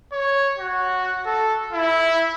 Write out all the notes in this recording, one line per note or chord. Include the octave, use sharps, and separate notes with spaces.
C#5
F#4
A4
E4